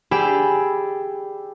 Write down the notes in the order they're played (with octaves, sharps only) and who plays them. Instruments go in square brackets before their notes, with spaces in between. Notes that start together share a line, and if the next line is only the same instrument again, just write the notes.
[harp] G4 G#4 D5 G5 B5 E6